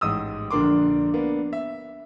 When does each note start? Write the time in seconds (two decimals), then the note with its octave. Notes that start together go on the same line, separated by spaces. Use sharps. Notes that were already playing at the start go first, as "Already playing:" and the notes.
0.01 A1 G#2 D#6 E6
0.51 A#1 D3 D4 A#4 C6 D6
1.14 A#3 B3 D4
1.53 E5